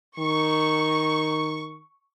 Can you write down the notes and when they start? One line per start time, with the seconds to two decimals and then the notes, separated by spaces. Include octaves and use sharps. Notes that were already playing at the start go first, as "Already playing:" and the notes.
0.19 D#3 C#6